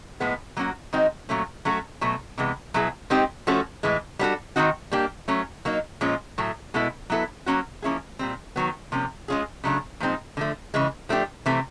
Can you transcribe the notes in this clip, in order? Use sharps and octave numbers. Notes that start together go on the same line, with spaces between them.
A2 F3 G#3 B3
F#3 A#3 C#4 F#4
D#3 G#3 C4 D#4 F#4
A#2 F#3 A3 C#4
F#3 A3 C#4 F#4 A4
B2 F#3 A3
C3 E3 G#3 B3
B2 F#3 B3 E4 G#4
G#3 C4 D#4 G4
F3 A3 C#4 F#4 A4
A2 E3 G#3
G3 B3 D4 F#4 A4
D#3 G#3 C4 D#4 F#4
G3 A#3 D4 G4
F#3 A3 C#4
F#3 A#3 D#4
A#2 F3 G#3 C#4 F4
A2 F#3 A3
B2 G#3 B3 E4 A4
F#3 B3 E4 A4
F#3 A#3 C#4 F#4
F3 A#3 C#4 E4 G#4
A#2 G3 C4
D#3 F#3 B3
C3 F3 A#3 C#4
G#3 C#4 F4 G#4
C#3 F#3 A3 D4
A#2 F3 G#3 C4 D#4
D3 F3 A3
C#3 E3 G#3
F3 A3 D4 G4
C3 E3 A3 C4